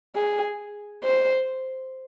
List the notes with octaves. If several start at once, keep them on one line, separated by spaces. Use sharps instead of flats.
G#4
C5